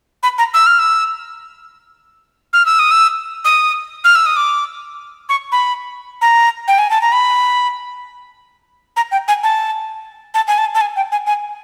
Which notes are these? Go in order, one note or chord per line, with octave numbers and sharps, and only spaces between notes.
B5
A#5
E6
F6
E6
F6
E6
D#6
E6
D#6
F6
E6
D#6
D6
C#6
B5
A#5
G5
G#5
A5
A#5
B5
A#5
G5
G#5
A5
A5
G#5
A5
A5
G#5
G5
G#5
G#5